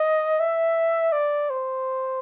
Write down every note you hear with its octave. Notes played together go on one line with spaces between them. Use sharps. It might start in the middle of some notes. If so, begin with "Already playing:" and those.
Already playing: D#5
E5
D5
C5